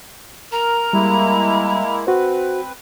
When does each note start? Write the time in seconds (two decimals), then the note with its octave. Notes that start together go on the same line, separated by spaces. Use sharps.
0.52 A#4 A#5
0.93 G3 G#3 A#3 E4
2.07 C4 F#4 B4 C5